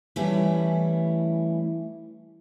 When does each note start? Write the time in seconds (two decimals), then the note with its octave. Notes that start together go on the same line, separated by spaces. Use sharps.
0.16 E3 G3 A3 C#4 E4